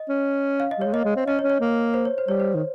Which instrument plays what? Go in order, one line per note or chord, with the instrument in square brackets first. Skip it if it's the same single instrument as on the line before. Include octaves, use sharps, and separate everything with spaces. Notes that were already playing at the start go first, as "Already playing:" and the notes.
Already playing: [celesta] D#5
[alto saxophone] C#4
[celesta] F5
D#5
[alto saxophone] G3
[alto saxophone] G#3 [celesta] C#5
[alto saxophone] A#3 [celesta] D#5
[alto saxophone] G#3
C4
[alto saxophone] C#4 [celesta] D#5
[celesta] C#5
[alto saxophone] C#4
[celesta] C#5
[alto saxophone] A#3
[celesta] C5
C#5
C5
[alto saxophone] G3 [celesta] C#5
[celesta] C5
[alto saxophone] D#3